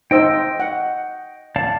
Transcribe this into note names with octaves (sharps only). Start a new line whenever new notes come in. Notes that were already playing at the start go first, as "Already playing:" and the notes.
D#4 C5 D#5 G5 E6
F#5
D5 F5 A5